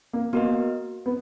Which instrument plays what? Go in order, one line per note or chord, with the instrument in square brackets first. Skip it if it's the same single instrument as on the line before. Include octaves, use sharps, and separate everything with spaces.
[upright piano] A#3
[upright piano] A#3 [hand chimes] B3 F#4 A#4 D#5
[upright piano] B3